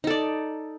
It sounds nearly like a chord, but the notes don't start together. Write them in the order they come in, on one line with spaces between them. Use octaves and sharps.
D#4 A4 D5